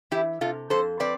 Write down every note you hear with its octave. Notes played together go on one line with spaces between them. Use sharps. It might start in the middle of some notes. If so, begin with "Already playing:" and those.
E3 E4 G4
C3 F4 A4
F2 A4 C5
C4 B4 D5